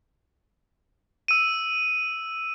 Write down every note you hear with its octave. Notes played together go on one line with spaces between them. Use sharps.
E6 D#7